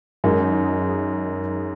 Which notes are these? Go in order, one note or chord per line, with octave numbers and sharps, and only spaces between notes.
F#2 D#3 G#3 D#4